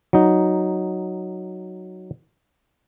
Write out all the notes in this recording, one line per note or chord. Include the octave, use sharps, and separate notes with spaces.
F#3 D#4